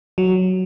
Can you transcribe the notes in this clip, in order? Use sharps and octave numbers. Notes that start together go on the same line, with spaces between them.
F#3